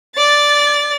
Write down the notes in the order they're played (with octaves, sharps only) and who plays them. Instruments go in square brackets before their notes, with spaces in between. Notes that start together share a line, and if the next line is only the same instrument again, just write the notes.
[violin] D5 A6